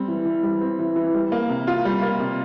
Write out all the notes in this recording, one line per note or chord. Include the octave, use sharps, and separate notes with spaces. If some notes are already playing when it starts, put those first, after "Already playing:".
Already playing: G3 C4
E3
E3
G3
C4
E3
E3
G3
A#3
C3
F4
G3
A#3
C3